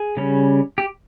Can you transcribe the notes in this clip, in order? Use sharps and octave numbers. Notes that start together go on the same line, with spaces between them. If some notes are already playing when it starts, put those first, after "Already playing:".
Already playing: G#4
C#3 G3 C#4
G4